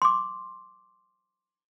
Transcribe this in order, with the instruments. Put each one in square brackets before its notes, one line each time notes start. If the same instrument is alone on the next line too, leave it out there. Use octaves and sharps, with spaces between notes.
[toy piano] C6 D6